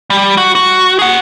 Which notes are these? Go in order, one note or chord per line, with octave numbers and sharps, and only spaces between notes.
G3
F#4
F#4
G#4 F#5